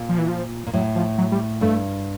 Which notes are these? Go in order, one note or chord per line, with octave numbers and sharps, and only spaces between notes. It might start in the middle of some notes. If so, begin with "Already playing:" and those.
Already playing: A#2
F3
E3
F3
A#2
A2 F#3
F3
F#3
G3
G2 A3